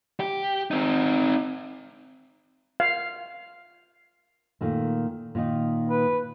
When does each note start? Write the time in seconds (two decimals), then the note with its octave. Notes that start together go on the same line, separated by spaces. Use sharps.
0.20 G4
0.71 C4 D#4
2.80 F5
4.61 A#2 D#3 A3
5.35 A#2 D#3 D#4
5.90 B4